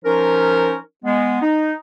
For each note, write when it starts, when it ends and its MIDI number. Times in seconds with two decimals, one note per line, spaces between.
0.04 0.75 53
0.04 0.75 61
0.04 0.75 63
0.04 0.75 70
1.04 1.40 56
1.04 1.40 59
1.42 1.74 63